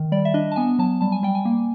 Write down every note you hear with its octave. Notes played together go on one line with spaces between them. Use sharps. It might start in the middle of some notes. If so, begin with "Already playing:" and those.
Already playing: D#3
G3 D5
E5
D4 D#5
A5
B3 G#5
F#3 A5
G3 A5
G#5
G3 G5
G#5
A#3